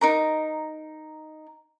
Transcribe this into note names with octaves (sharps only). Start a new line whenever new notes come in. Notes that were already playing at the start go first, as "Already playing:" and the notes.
D#4 A#4 A#5